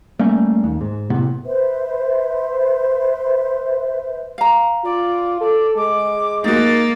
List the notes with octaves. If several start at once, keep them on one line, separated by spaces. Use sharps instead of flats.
G3 A3 A#3 C#4
D#2
G#2
A2 C3 B3
B4 C5 E5
F5 A#5
F4 D5
A4 D5
G#3 D6
A#3 D#4 F#4 A6